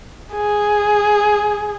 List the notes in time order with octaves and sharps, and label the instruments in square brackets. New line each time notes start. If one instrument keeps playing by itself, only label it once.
[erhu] G#4